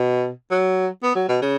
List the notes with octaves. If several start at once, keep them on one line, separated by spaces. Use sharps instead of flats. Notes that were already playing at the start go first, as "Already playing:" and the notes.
Already playing: B2
F#3
B3
F#3
B2
C#3